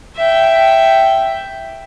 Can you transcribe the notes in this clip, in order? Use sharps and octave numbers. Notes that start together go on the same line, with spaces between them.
E5 G5